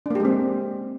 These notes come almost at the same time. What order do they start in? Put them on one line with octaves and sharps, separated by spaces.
D4 A#3 G4 G#3 C4